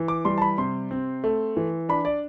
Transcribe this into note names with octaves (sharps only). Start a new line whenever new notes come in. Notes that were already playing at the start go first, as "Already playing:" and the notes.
Already playing: E3
D6
G3 C6
A5
B5
C3 C6
C4
A3
E3
D4 B5
D5